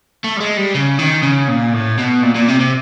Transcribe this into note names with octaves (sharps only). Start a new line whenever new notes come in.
A3
G3
G#3
G3
C#3
D#3
C#3
A#2
A2
B2
A#2
A#2
C3
C3